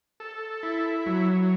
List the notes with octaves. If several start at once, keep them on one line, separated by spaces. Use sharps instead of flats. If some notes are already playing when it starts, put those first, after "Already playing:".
A4
E4
F#3